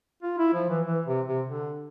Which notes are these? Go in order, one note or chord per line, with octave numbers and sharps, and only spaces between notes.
F4
E4
F3
E3
E3
C3
C3
D3